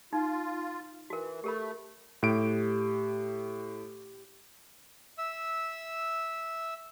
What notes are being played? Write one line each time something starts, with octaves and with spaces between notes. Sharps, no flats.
D#4 F4
E3 F#4 A#4
A3 G4 A#4 B5
A2 G4 D7
E5 E6